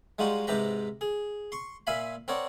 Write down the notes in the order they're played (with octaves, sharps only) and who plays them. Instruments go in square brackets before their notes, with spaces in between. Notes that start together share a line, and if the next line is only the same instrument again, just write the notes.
[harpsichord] G3 G#3 D#4 F4 F#4
G#2 C3 G4 B4 A#5
G#4
C6 C#6
A#2 E5 F5 G#5 B5
C4 A#4 C#5 D5 F#5